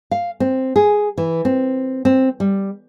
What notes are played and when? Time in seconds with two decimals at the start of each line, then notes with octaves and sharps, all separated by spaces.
0.11 F5
0.40 C4
0.76 G#4
1.18 E3
1.45 C4
2.05 C4
2.40 G3